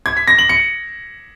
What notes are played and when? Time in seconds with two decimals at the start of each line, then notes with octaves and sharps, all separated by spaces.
0.06 G#6
0.17 B6
0.28 A#6
0.38 F#7
0.49 C#7